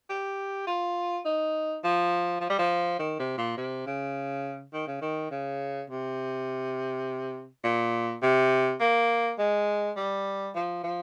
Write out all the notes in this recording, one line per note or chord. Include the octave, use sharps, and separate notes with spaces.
G4
F4
D#4
F3
F3
G3
F3
D#3
C3
A#2
C3
C#3
D#3
C#3
D#3
C#3
C3
A#2
C3
A#3
G#3
G3
F3
F3